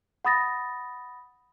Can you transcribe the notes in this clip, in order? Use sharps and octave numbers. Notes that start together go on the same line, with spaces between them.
F#5 B5 D#6 A6 A#6